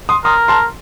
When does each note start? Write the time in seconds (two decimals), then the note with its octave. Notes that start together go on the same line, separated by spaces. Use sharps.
0.09 C6 D#6
0.24 A#4 C6 D#6
0.48 A5 C6